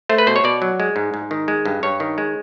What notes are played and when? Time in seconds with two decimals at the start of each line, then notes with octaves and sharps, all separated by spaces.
0.09 A3 C5
0.18 B4
0.27 B2 C5
0.36 C#5
0.44 B2 D5
0.62 F#3
0.80 G#3
0.96 G#2
1.14 G#2
1.31 D#3
1.48 G#3
1.65 G2
1.83 G2 C#5
2.00 D#3
2.18 G#3